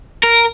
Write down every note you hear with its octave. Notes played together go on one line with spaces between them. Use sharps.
A#4